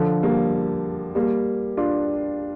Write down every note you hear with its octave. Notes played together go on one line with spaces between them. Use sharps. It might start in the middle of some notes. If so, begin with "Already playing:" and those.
Already playing: D3 F3
G3 A#3
G3 A#3
D4 F4